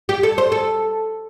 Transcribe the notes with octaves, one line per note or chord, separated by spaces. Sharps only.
G4
A4
C5
A4